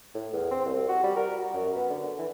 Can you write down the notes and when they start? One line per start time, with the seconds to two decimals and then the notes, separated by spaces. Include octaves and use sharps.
0.15 A2
0.33 E2
0.51 C4
0.66 C2
0.88 F#4
1.04 G3
1.16 A#4
1.38 F#4
1.54 F#2
1.75 B3
1.90 D3
2.19 E3